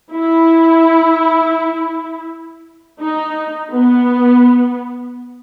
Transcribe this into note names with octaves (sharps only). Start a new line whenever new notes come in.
E4
D#4
B3